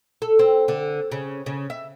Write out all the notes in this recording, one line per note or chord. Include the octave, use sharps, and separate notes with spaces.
A4
C4
D3
C#3
C#3
E5